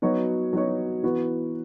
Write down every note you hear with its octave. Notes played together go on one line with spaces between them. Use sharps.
F#3 B3 D#4 F#4 C#5
F#3 B3 D#4 F#4 C#5
E3 B3 F#4